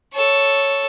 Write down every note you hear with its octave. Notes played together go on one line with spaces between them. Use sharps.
A4 C#5